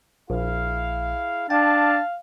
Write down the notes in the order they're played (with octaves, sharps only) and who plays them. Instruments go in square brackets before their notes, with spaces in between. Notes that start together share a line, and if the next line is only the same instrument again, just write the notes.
[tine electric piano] A#1 [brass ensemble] E4 G#4 F5
[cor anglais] D4 [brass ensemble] F5 [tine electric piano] G5 [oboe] A5